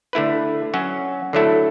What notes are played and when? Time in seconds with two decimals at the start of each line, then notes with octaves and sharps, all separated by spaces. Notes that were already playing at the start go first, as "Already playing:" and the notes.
0.13 D3 A3 E4 B4
0.74 F#3 C#4 F#4
1.33 D3 F#3 A3 E4 A4